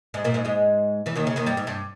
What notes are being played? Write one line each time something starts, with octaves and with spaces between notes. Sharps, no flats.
G#2 G#3
A#2 A#3
G#2 G#3
G#2 G#3
E2 E3
D#2 D#3
C#3
D#2 D#3
G2 G3
G#2
G2